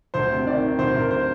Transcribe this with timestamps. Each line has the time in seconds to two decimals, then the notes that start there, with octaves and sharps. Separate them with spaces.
0.14 D2 C5
0.31 C3
0.46 D#3 D5
0.62 D#3
0.79 D2 C5
0.94 D2 A#4
1.11 C5